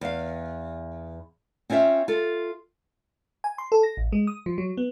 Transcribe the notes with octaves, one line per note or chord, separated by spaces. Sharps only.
E2 F5
C4 C#4 F4 C5 E5
F4 A4
G#5
C6
A4
A#6
A1
G#3
D#6
F3
F#3
B3